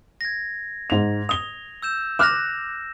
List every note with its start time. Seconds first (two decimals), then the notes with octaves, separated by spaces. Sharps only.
0.21 G#6 A#6
0.90 G#2 F7
1.29 D#6 F7 G7
1.82 E6 G6 E7
2.19 D6 F6 F#6 A#6 E7